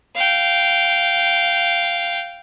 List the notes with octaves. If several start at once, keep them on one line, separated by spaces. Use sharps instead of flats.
F5 G5